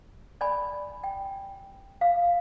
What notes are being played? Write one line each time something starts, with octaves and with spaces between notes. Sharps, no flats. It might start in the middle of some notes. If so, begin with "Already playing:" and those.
D5 G#5 B5
G5
F5